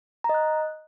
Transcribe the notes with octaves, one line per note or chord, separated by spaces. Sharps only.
A#5
D#5
F#6